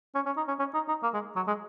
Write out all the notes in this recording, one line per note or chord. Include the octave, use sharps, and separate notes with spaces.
C#4
C#4
D#4
C#4
C#4
D#4
D#4
A#3
G#3
F#3
G#3